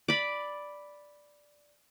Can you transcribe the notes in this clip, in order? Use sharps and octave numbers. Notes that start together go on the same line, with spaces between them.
D5 B5